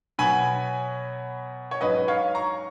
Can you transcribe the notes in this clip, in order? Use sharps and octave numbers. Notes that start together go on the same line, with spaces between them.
B2 F#3 B3 G#5 B5
C#5
G#2 F#3 C#4 B4 D#5
C#5 F5
A#5 C#6